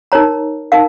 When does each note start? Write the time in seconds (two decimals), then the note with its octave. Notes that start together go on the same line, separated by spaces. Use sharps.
0.12 D#4 A#4 C#5 A#5
0.72 D#4 A#4 F5